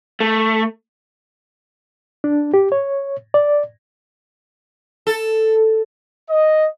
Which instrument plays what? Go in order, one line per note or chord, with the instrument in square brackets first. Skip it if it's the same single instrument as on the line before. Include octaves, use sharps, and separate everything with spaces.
[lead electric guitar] A3
[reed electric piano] D4
G4
C#5
D5
[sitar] A4
[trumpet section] D#5